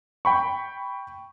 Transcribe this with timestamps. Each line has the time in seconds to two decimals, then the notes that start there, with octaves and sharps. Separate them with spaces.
0.25 G5 B5 C#6